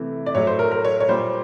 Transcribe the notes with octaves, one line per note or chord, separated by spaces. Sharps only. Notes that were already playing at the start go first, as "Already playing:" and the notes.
Already playing: C3 E3 A3
D5
A2 F#3 A3 C#5
C5
A#4
A#4
C#5
C#5
A#2 G3 C5